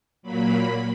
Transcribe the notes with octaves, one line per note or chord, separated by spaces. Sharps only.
A#2 F#3 A#3 B5